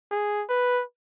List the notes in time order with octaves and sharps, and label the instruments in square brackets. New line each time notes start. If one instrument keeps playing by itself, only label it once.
[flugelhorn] G#4
B4